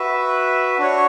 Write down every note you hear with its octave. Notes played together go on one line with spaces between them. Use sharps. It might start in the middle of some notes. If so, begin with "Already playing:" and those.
Already playing: F#4 B4 E5
D4 F#4 C#5